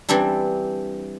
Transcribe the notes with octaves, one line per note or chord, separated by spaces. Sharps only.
E3 G3 C4 D4 E4